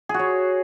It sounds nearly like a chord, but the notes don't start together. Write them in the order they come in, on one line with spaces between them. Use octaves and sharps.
G#4 F#4 C#5